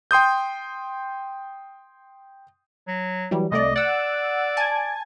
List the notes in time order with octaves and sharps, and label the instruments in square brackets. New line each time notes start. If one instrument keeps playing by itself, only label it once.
[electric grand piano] G5 C6 D#6 G6
[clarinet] F#3
[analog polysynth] E3 F#3 G3
[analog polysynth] C2 A3 D5 [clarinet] D#5
[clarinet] D5 [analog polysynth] F#5 E6
[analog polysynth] G#5 A5 G#6